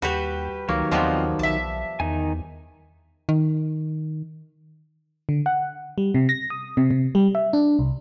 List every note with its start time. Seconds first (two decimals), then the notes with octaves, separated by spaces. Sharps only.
0.02 D#2 G3 F#4 G4 B4
0.69 C#2 D#3 F#3 A#3 C#5
0.91 D#2 F3 G3 B3 C4 F4 D#5
1.39 B1 E5 A5
2.00 E2 D#3 D#4 G#5
3.29 D#3
5.29 D3
5.46 F#5
5.98 G3
6.14 C3
6.29 A#6
6.50 D#6
6.77 C3
6.91 C3
7.15 G3
7.35 E5
7.53 D4
7.79 C2